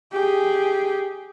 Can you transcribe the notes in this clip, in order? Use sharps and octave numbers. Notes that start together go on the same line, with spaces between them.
G4 G#4